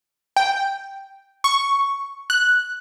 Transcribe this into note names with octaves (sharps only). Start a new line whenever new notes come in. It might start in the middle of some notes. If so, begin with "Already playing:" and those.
G5
C#6
F#6